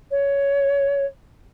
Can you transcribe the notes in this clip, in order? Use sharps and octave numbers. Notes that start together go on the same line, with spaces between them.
C#5